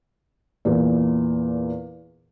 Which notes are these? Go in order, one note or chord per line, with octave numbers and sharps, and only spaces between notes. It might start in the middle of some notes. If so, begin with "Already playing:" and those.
E2 A#2